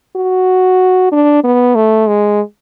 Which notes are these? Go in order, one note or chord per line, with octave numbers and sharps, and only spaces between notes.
F#4
D4
B3
A3
G#3